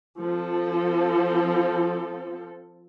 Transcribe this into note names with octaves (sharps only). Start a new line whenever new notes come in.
F3 C4 A4